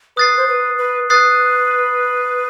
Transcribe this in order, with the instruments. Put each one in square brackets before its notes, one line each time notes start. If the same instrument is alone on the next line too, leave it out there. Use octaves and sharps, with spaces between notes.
[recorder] B4 [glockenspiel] D#6 F#6 A6 C7
[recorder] C5
B4
B4
[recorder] B4 [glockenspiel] D#6 F#6 A6 C7